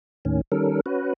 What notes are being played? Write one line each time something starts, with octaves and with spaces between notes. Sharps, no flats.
D#2 A2 D#3 C#4
D#3 G3 C#4 A4 A#4
C#4 F#4 B4